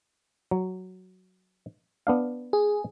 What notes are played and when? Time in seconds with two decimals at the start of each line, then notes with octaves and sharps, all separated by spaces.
0.51 F#3
2.07 B3 D4 F5
2.53 G#4